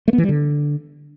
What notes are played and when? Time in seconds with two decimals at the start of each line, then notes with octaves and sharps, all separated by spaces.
0.08 A3
0.13 B3
0.18 E3
0.24 G3
0.29 D3